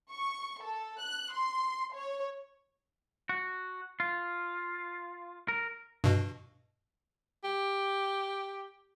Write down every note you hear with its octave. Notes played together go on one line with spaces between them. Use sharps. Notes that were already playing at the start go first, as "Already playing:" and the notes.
C#6
A4
F#6
C6
C#5
F#4
F4
A#4
G2 B2
G4